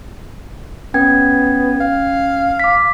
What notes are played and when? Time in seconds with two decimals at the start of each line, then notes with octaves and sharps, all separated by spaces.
0.94 B3 C#4 G5 G#6
1.80 F5
2.60 D6 B6